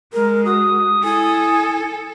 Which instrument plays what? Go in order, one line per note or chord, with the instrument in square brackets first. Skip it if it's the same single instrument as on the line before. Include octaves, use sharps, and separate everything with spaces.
[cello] G#3 [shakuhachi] A#4
[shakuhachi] F#4 [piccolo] D#6
[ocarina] E4 [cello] A4 [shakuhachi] G#5